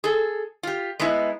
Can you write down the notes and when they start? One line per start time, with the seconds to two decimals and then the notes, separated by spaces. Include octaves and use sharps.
0.04 G#4 A4
0.63 F4 G4
1.00 G#3 B3 D#4 E4